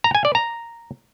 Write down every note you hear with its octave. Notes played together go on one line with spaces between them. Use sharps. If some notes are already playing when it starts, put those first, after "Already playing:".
A#5
G#5
D5
A#5